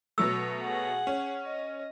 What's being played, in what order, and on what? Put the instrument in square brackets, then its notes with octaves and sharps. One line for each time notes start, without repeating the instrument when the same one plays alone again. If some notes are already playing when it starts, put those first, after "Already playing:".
[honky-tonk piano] B2 F#3 A3 [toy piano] E6
[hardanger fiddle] G#4 F#5
[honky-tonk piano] C#4
[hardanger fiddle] D#5